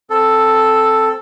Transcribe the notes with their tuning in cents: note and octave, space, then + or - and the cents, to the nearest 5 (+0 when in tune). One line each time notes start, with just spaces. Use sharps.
C4 +0 A4 +0